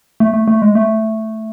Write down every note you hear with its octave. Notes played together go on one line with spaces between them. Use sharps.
A3
A3
A3
G#3
A3